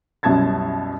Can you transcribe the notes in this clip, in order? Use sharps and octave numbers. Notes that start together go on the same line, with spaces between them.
C2 F#2 B2 A5 G#6 A6